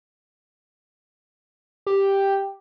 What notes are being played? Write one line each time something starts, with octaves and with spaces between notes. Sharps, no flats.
G4